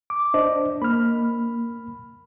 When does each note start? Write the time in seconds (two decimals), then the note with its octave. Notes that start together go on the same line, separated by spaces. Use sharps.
0.10 D6
0.34 D4 C5 D#5
0.82 A#3 B5 F6